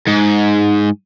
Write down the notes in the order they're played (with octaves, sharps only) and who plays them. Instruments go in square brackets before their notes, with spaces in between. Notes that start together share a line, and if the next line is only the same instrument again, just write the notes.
[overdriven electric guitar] G#2